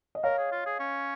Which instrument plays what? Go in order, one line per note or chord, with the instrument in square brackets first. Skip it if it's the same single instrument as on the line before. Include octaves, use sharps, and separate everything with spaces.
[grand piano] D#5
[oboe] A#4 [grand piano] C#5 F5
[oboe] G#4
F4
G#4
C#4